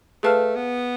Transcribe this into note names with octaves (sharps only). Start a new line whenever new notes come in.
A3 G#4 B4 F5 A5 F6
B3